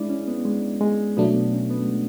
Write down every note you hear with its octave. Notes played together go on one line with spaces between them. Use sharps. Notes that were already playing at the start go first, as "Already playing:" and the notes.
Already playing: G#3 D4 E4 D5
C#4
B3
G#3
G#3
B2 F#3 A3 B3 D4
B3
C#4
B3
G#3
A3